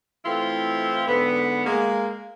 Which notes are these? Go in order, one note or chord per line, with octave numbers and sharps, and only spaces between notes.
E3 A3 C4 E4 F4
G#2 D3 B3
G#3 A#3